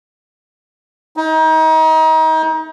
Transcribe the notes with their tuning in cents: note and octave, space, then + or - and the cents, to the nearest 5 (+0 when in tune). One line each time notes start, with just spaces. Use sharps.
D#4 +30